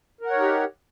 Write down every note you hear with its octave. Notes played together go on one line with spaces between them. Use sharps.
D#4 G4 A#4 C#5 F#5